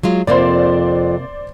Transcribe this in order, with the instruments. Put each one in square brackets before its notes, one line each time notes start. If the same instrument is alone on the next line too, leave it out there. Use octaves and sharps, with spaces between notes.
[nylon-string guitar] F#3 G#3 F4
[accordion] F2 [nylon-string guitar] C3 A#3 C4 [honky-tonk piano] C5 D5